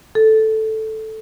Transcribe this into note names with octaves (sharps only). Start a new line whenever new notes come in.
A4